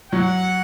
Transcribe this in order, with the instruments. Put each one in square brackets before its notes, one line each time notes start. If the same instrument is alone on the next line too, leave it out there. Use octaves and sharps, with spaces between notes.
[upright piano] F#3 [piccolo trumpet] F#5